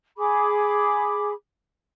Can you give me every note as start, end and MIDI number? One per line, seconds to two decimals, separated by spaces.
0.18 1.32 68
0.18 1.32 83
0.18 1.32 86